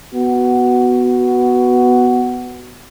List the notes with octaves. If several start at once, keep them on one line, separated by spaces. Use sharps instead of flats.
B3 F#4